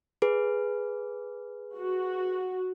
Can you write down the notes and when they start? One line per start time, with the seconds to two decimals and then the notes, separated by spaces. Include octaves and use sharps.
0.22 G#4 B4
1.78 F#4